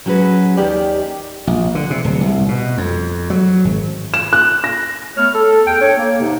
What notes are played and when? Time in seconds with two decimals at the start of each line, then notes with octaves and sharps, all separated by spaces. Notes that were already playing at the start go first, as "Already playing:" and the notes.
0.06 F#3 C#4 F#4 G#4 B4
0.57 D#2 D#3 G4 D5
1.47 A#1
1.75 D3
1.90 C3
2.04 D1
2.21 C2
2.48 B2
2.78 F2
3.30 F#3
3.65 G#1
4.14 E7
4.33 F#6
4.64 A#6
5.17 A3 B3 C#5 F6
5.33 A4
5.66 E2 G5
5.81 D4 A4 C#5
5.97 A#3
6.20 G#2 C3